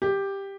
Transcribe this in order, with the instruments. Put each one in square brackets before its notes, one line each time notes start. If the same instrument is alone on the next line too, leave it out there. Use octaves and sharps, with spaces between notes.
[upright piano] G4